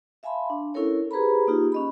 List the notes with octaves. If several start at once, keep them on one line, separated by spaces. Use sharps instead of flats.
E5 F5 G#5 A5 B5 C6
D4
C#4 E4 A4 A#4 C#5
G4 G#4 B4 C5 A#5 B5
A#3 D#4 F4 G4
C#4 D#5 B5